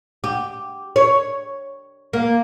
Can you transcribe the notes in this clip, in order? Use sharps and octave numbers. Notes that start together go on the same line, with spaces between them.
G4
C#5
A#3